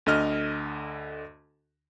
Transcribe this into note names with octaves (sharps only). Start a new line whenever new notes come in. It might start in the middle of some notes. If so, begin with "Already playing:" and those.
D2 D3 D#5 F6